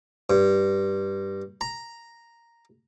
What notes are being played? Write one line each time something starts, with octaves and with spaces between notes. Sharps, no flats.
G2
A#5